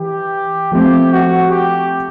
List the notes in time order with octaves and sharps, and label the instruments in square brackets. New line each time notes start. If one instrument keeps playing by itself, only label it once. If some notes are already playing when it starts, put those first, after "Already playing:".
Already playing: [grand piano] E3 [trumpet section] G4
[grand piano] F3 A3 C4 [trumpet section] G4
[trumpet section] F#4
G4